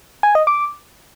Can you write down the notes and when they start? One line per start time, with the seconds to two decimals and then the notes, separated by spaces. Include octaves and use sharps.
0.23 G#5
0.35 D#5
0.47 D6